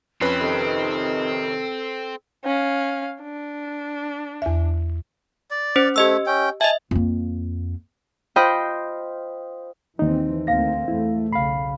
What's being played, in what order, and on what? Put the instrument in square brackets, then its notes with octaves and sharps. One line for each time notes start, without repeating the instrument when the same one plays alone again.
[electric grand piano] F2 C#4 B4 [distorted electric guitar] C4
[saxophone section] C3 D#3 D#4 [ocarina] A4
[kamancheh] C#4 F5
D4
[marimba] E2 E5
[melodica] D5
[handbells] C#4 C5
[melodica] A3 [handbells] G4 D#5 E6
[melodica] C#4 G5
[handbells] D#5 E5 [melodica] G#5 A5
[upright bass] F2 A#3
[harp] F4 C5 D#5 G5 B5
[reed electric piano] D#2 D#4 [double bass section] E3 C4
[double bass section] D2 A#3 C4 [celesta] F5 A#6
[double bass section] E2 A3 [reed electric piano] E4
[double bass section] B1 C#3 [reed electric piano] F5 B5 [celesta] C7